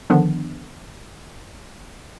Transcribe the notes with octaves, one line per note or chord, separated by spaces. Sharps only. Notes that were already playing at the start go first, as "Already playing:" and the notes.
D3 D#3 F3 B3 D4